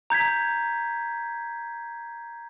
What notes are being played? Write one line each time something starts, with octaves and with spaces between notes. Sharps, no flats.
A#5 G6 G#6 B6